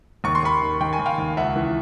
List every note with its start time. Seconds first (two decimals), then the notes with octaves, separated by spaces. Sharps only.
0.24 D#2 C#6
0.35 C6
0.43 D#2 B5 C#6
0.62 D#3
0.81 D#3 G5
0.93 G#5
0.99 D#2
1.06 F5 G5
1.18 D#2
1.37 C#2 E5 F#5
1.56 E3